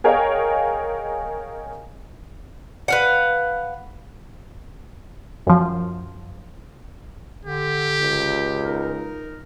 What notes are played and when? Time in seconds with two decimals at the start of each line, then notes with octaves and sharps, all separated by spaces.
0.04 G#4 A#4 C#5 D#5 F5 G5
2.88 B4 F5 F#5
5.47 F#2 F3
7.45 D3 G4
8.00 C#2
8.63 D#4 A#4